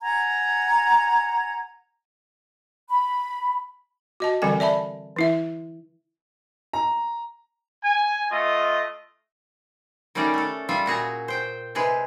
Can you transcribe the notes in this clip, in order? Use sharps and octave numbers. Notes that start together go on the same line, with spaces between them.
F#5 G#5 A#5 G#6
B5
F#4 D#5 A5
D3 E3 G3 C4 A4 G#5
D5 E5 A5 B5
E3 E4 E5
A#5
G#5
A3 F4 D#5
D#3 G3 A3 C#4 D5 A#5
A3 A4
G3 F4 E5
A#2 F#4 G#4 A#5
C5 G5
C3 G#3 G#4 B4